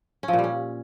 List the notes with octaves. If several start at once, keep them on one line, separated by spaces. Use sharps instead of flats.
C#4
F3
A#2
G3
C#4